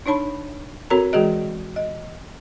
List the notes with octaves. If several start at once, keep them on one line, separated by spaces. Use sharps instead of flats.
D4 D#4 C#5 A5 B5
C4 F#4 A4 A#4 C#5 A#5
E3 G#3 F#4 G#4 D#5
D#5